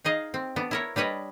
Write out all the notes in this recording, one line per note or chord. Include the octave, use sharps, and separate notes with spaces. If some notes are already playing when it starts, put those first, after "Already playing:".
D#4 G#4 D#5 F5
C4
B3 D4
E4 A#4 C#5
G3 D4 B4 C#5 D#5